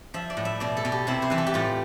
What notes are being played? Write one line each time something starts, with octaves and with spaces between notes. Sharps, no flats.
F3 E5
D5
A2
E5
B2 D5
A4
B2
G4
C3 E4
C5
E3 B4
A4
G4
A2 F4